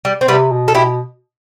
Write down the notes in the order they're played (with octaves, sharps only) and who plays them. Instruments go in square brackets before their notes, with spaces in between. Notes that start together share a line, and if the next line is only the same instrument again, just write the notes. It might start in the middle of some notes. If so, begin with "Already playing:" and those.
[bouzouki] G3
C4
[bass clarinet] C3 [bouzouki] G3 B3
[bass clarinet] B2
[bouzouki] A4
[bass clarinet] B2 [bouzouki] E4 G4